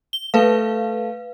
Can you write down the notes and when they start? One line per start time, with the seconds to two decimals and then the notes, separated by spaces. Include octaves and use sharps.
0.13 G7
0.34 A3 B4 F5